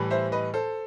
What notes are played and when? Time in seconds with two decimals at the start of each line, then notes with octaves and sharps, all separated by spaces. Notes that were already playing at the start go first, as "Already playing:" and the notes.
Already playing: A2 E3 G3
0.11 C5 E5
0.32 B4 D#5
0.54 A4 C5